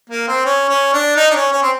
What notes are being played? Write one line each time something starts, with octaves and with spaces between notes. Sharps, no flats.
A#3
C4
C#4
C#4
D4
D#4
D4
C#4
C#4
C4